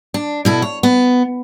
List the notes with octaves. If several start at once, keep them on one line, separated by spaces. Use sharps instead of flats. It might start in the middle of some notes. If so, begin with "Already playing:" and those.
D4
B2 E4 A4
C#5
B3